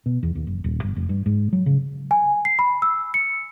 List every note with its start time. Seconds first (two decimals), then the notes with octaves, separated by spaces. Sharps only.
0.06 B2
0.23 E2
0.35 D#2
0.47 F#1
0.64 D#1
0.83 G1
0.96 F1
1.09 G2
1.26 G#2
1.53 F#3
1.66 C#3
2.11 G#5
2.45 C7
2.59 B5
2.82 E6
3.14 C#7